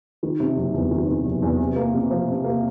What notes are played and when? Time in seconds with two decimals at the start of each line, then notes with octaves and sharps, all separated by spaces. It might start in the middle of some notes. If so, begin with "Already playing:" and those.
0.23 D#3
0.40 C3
0.57 F#1
0.74 E2
0.91 D#3
1.08 C3
1.25 F#1
1.42 E2
1.59 C3
1.76 A#3
1.93 C3
2.10 F3
2.28 C3
2.44 A#3